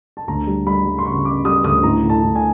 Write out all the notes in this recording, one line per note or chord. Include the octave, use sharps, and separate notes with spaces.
A5
D2 A#5
G3
G3 B5
G3
C6
C#3 C#6
C#3 D6
G3 D#6
D2 D#6
A2 A#5
A2
A5
A2
G#5